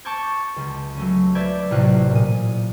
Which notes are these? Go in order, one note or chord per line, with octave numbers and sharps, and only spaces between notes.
A5 C#6 D6 G6 G#6
C#2
F#3 A3 C#4
B4 D5 E5 G6 G#6
A1 C3 F#3 F4 F#6
A#2 D#6